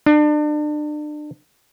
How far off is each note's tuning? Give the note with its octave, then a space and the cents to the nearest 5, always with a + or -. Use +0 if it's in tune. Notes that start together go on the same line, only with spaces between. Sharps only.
D4 +35